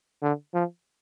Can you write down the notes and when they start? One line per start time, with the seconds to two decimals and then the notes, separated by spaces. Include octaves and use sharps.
0.22 D3
0.54 F3